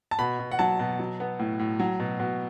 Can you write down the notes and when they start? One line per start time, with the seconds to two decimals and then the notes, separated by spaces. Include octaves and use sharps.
0.11 A5
0.19 B2 B5
0.39 B2
0.51 F#5
0.59 F#3 A5
0.79 B2
0.99 F#3
1.20 B3
1.39 A2
1.59 A2
1.80 F#3
2.00 B2
2.20 B2